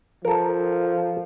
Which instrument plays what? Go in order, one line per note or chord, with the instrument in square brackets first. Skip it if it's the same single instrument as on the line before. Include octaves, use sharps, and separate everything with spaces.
[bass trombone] F3 [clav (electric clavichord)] A4 A#4